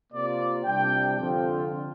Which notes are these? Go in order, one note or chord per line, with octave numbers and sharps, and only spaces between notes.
C3 A#3 F4 D5
C2 C3 G3 D4 G5
F2 D3 F3 C4 F4